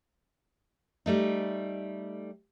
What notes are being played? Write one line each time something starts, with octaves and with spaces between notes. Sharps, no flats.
G3 A3 D#4